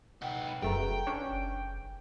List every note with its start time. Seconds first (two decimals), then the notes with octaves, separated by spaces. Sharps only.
0.22 D#4 B4 F#5 G5
0.62 F1 F#2 A3 G#4 B4 G5 A#5
1.07 C#4 D4
1.29 F#1